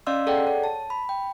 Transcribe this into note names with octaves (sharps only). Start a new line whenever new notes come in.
C#4 D5 D#5 F5 C6 E6
G#4 A4 D5 F#5 G5
C#5
A5
B5
G5